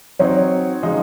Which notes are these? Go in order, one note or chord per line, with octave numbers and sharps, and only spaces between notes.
F#3 C4 D#4 C#5
C#3 F3 G#3 D#4 D#5